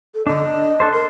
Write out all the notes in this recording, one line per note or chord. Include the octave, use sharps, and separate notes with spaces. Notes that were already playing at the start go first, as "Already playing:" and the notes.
A4
D3 D4 D#5
D4
D4 A4 C5
A#4 C6